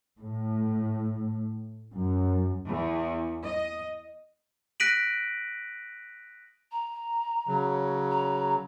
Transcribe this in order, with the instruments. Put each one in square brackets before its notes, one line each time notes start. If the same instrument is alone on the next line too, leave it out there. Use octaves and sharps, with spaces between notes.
[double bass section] A2
F#2
[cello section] E2
D#5
[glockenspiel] F#6 A#6 B6 D7 D#7 F#7
[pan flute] A#5
[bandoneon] C#3 F#3
[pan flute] A#5